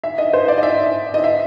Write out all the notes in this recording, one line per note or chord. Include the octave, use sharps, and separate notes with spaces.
E5
D#5
C5
D5
D#5
E5
D#5
E5